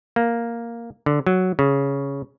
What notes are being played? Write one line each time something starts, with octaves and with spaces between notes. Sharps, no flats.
A#3
D3
F#3
C#3